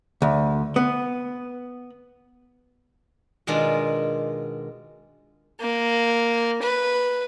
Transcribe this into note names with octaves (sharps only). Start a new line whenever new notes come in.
D2
B3
B2 D#3 G#3 D4 F4 A#4
A#3
B4